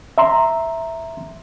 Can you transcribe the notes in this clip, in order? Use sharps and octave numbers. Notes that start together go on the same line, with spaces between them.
E5 A#5 C6